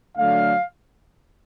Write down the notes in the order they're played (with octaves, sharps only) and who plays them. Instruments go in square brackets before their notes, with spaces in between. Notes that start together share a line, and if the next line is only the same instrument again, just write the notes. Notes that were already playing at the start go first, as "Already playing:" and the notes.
[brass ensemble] D3 F#3 A3 D4 F5